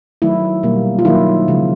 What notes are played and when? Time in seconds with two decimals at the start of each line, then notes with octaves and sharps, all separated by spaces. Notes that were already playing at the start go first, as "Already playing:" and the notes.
0.22 D#3 F#3 A3 E4
0.63 B2 G3 A#3
0.99 F4
1.05 D#3 F#3 A#3 E4
1.48 C#3 F3 G#3